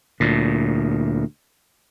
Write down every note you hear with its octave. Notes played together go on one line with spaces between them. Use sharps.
D2 A#2